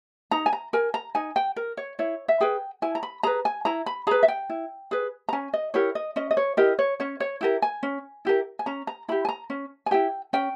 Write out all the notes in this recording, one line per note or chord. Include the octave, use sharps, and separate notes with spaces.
D#4 A#5
G#5
A#5
A#4 G#5
A#5
D#4 G#5
G5
A#4
C#5
E4 C#5
E5
G#4 B4 G5
E4 G#5
A#5
B5
G#4 B4 A#5
G#5
E4 A#5
B5
G#4 B4 A#5
E5
G5
E4
G#4 B4
A#5
C#4 G#5
D#5
E4 G4 A#4 C#5
D#5
C#4 D#5
D#5
C#5
E4 G4 A#4 D#5
C#5
C#4 C#5
C#5
E4 G4 A#4
G#5
C#4
E4 G4 A#4
G#5
C#4 A#5
A#5
E4 G4 B5
G#5
A#5
C#4
G#5
E4 G4 G5
C#4 G5